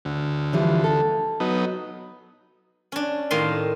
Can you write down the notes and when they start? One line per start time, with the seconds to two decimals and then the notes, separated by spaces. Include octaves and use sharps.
0.05 D2
0.53 E3 F3 G3
0.84 A4
1.40 F#3 B3 D#4
2.92 C#4 D4
3.31 A2 D#3 F5 C6